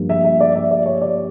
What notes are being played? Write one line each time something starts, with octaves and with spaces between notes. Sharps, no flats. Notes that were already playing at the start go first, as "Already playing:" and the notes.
Already playing: G2 F3 A#3
E5
E5
D5
E5
D5
C#5
D5